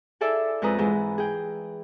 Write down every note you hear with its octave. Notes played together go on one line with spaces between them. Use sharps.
E4 G#4 A4 D5 E5
F2 G#3 B4 A#5 D#6
G#2 E3 G#3
G#4 G5